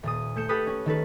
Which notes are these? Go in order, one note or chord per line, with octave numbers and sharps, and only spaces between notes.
D#1 A#2 D#6
A3 G6 C#7 E7
G4 A4 B4 B5 D#6 F#6
C#4
D#3 A4 B4